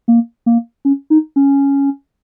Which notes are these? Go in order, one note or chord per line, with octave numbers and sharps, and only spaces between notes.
A#3
A#3
C#4
D#4
C#4